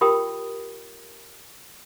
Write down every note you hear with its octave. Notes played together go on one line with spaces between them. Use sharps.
F4 G4 A#4 G5 B5 D#6